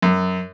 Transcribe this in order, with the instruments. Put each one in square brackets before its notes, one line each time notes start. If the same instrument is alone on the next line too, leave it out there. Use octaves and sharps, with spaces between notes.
[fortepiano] F#2